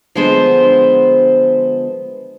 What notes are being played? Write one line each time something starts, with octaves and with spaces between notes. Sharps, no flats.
D3 F3 G#3 B3 C5